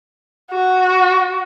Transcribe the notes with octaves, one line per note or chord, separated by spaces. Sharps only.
F#4